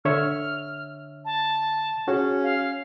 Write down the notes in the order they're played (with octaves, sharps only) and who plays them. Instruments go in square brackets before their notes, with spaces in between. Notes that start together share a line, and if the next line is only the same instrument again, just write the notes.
[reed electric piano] D3 C#5 E5 [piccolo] F6
[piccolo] A5
[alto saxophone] C#4 [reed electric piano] F#4 G#4
[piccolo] F5